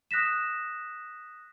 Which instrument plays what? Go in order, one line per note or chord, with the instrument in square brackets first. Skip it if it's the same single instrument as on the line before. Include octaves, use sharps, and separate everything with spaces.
[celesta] D#6 F#6 A#6 B6 E7